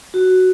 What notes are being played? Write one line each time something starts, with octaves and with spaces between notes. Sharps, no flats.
F#4